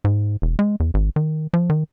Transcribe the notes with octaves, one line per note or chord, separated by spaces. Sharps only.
G#2
E1
G#3
E2
G#1
D#3
F3
D#3